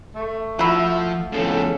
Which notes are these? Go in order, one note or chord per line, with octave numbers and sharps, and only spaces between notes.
A3
F3 E4 F#4
F2 A2 C#3 F3 B3 A4